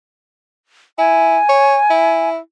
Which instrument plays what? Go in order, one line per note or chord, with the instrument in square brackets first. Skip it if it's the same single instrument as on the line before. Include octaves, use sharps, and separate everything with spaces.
[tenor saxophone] E4 [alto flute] G#5
[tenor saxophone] C#5
E4